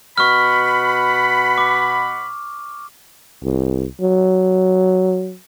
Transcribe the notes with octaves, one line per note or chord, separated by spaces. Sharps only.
B2 F#5 B5 C#6 F6
D6
C2
F#3